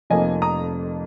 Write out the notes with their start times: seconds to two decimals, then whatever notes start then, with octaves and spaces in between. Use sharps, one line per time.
0.10 F1 F2 F3 A#3 D#5 G#5
0.42 A#5 D#6